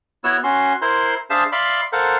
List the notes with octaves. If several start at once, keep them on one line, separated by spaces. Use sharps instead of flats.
B3 E4 F#4 C#5 E6
C#4 F#4 C6
E4 A#4 C5 C6
D4 G#4 C5 E5 F5 A5
D5 E5 F5 B5 C6
A4 A#4 C5 F5 F#5